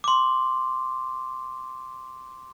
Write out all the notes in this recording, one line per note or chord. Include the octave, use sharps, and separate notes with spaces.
C6 D6